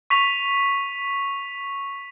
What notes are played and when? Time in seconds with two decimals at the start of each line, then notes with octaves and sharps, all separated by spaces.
0.10 C#6 B6 F7